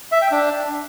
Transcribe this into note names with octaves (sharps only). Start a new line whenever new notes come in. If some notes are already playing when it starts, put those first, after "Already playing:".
E5
G5
D4